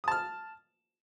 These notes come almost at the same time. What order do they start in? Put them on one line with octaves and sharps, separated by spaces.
D#6 A5 F6